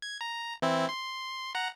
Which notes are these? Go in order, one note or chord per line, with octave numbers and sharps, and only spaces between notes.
G#6
A#5
E3 C4 E4
C6
F#5 A#5